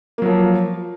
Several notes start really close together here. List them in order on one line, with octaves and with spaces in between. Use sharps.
A#3 F#3 F3